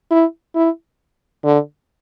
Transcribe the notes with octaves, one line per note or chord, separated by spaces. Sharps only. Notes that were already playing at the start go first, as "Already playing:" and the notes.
E4
E4
D3